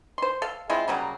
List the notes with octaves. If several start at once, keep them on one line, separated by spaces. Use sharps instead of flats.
C5 C6
A4 F5
G#3 C4 E4 F4
C#3 F#3 G3 A#3